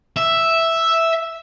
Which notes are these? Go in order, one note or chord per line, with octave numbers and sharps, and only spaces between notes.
E5